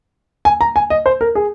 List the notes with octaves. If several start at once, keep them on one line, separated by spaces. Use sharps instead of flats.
G#5
A#5
G#5
D#5
C5
A#4
G#4